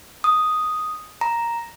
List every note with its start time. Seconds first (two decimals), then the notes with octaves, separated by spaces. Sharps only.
0.24 D#6
1.21 A#5